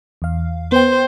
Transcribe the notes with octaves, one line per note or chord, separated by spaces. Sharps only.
E2 F5
B3 C5 G5